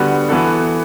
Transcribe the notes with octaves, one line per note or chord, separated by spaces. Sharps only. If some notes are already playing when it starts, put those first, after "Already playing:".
Already playing: D3 G3 B3 F#4
E3 B3 F#4 A4